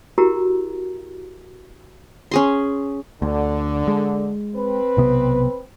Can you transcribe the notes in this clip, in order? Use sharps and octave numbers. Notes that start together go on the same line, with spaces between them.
E4 F#4 G4 A#4 A#5
C#4 G#4 C6
D2 D3
G#3
C4 B4
B1 C3 B3